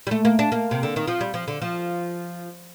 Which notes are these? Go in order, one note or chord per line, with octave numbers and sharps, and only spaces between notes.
G3
A3
A#3
D4
A#3
C3
D3
D#3
F3
G3
F3
D3
F3